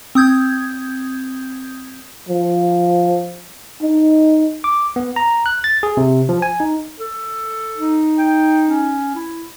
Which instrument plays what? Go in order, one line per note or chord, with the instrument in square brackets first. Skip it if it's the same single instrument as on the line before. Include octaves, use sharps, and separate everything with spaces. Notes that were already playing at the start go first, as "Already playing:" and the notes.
[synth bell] C4 D#6 G6 G#6
[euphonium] F3
D#4
[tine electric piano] D6
B3
A#5
F#6
A6
G#4
C3
F3
G#5
D#4
[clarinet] A4
[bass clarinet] D#4
[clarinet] G5
C#4
E4